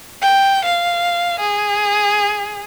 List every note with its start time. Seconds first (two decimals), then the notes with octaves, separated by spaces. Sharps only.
0.22 G5
0.65 F5
1.40 G#4